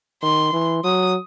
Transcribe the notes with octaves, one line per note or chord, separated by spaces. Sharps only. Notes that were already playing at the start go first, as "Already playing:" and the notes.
D#3 C6
E3
F#3 D#6